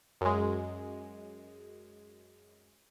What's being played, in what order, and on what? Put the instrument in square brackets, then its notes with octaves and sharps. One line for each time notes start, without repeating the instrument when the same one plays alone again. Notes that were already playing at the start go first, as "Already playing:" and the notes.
[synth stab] F#2 G#3